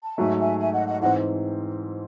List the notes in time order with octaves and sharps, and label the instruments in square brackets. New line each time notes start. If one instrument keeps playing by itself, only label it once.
[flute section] A5
[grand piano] G#2 F#3 A3 [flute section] E5 G#5
[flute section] E5 G#5
E5 G#5
D#5 F#5
D#5 F#5
[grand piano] G#2 E3 C4 [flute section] D#5 F#5